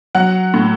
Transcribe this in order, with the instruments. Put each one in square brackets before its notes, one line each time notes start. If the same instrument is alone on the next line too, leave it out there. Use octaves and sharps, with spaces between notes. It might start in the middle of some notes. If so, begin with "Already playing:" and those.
[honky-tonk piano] F#3 F#5
A2